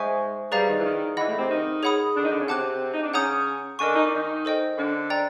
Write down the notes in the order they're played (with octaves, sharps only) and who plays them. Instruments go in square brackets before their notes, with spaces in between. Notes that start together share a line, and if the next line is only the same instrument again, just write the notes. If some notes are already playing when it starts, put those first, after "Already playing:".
Already playing: [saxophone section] G#2 G#3 [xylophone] C5 E5 G#5 C#6
[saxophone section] G2 G3 [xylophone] G#4 B4 D5 F5 A#5
[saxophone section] D#3
E3
D#3
[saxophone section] E3 [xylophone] D#5 F#5 B5
[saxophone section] A2 A3
C3 C4
D#3 D#4
[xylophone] G#4 C#5 F#5 B5 D#6
[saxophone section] D3 D4
D#3 D#4
D3 D4
C#3 C#4
[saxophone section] C3 C4 [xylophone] F#5 A5 D6 F#6
[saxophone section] D#4
D4
[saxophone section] C#3 C#4 [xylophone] F#5 A#5 D#6 G6
[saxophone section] D3 D4 [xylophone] A#4 D#5 G#5 C#6
[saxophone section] D#4
D4
D#3 D#4
[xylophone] A4 C5 D#5 G5
[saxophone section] D3 D4
[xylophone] D5 G5 A#5